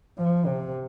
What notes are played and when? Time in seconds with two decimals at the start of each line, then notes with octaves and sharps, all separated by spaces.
0.18 F3
0.46 C3